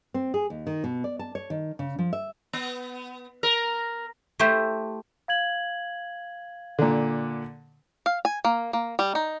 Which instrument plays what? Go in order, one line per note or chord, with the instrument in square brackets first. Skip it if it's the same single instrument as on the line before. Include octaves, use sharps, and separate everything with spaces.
[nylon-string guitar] C4
G#4
D#2
D#3
B2
D5
A5
C#5
D#3
C#3
F3
E5
[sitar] B3
A#4
[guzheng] A3 E4 G4 C5
[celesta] F5 G#6 F#7
[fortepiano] A#2 D3
[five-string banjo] F5
G#5
A#3
A#3
G3
D#4